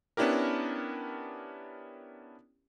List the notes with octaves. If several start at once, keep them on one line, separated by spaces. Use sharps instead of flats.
B3 C#4 D4 E4 G4 A#4